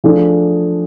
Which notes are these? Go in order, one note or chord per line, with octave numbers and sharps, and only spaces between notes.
F3 A3 D4 G#4